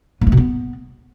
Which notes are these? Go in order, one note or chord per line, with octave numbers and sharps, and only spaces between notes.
B3
A3
B2
B3